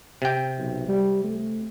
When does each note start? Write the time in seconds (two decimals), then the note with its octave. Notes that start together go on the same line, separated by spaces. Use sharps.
0.22 C3 G5
0.58 B1
0.88 G3
1.24 A3